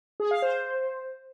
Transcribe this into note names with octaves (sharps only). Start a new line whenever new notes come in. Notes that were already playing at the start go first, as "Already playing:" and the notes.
G#4
F5
C5